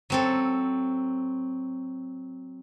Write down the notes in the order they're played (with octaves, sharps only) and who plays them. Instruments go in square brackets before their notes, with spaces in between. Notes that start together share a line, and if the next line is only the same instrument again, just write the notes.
[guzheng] F#3 C4 A4